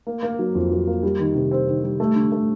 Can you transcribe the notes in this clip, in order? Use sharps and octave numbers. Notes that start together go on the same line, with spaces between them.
A#3
A#3
F#3
F2
F#3
A#3
G3
D#3
C3
C4
D#3
G3
A3
D3
A3